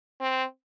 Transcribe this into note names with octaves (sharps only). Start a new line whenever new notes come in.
C4